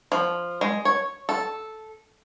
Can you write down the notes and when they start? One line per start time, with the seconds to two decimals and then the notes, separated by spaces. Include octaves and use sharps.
0.12 F3
0.61 G#3
0.85 C#5
1.29 A4